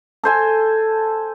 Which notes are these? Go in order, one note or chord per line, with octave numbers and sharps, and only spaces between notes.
A4 C5 G#5